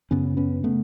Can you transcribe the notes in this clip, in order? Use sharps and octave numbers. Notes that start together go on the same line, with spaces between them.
F#2 C#3 B3 C#4
B3 C#4
C#3 A3 B3